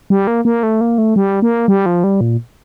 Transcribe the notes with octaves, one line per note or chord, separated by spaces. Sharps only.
G3
A#3
A#3
A3
A#3
A3
G3
A#3
G3
F3
G3
A#2